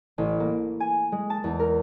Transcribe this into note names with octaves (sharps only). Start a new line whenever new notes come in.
A1
A#3
G#5
G#3
A5
E2
A#4